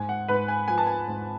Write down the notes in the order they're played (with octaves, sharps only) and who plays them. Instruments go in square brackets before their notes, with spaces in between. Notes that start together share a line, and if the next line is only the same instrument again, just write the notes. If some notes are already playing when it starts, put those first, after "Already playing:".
Already playing: [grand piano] G#2 G#5
F#5
G#2 B4
G#5
F3 G#5
A5
G#5
G#2